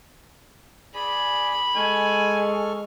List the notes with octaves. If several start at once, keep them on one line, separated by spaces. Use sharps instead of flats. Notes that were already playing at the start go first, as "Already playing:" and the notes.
G#4 D5 G#5 B5
G#3 A4 G#5 C#6 F6